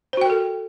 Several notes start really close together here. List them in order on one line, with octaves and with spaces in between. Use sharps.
C5 F#4 G5 A#4 A4